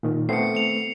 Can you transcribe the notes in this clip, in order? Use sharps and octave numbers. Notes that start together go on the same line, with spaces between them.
A#2 D#3
A3 B3 C4 C7 C#7
C#7 F7